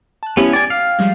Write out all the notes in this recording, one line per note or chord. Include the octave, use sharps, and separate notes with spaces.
A5 F#6
B3 C#4 E4 G4
D5 G5 G#5
F5
F3 G3 G#3